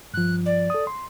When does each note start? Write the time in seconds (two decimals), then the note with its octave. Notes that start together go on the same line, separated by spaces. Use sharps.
0.14 G2 F3 F#6
0.46 D5
0.70 A4 D#6
0.87 C6